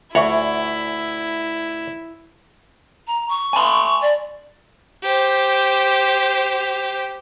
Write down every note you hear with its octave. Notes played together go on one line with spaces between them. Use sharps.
D2 E4 F4 C#5 E5 F#5 C#6
A#5
C#6
G#5 A5 C6
D5
G4 C5